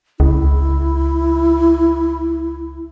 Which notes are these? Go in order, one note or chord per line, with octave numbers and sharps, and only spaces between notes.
C#2 E4